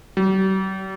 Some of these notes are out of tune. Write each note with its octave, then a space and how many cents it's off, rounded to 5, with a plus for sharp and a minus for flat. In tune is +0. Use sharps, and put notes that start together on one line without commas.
G3 -45